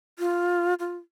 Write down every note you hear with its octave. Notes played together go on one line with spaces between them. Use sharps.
F4
F4